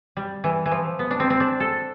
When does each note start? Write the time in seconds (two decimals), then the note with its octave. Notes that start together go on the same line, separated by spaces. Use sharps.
0.17 G3
0.44 E3
0.66 E3
0.71 F3
0.99 B3
1.11 D4
1.20 C4
1.30 C4
1.40 D4
1.60 A4